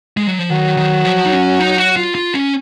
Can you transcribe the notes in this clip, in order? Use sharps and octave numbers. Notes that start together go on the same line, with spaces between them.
G#3
F#3
F3
D#3 F#3
D#3
F3
D#4
C#4
D#4
F#4
F4
F4
C#4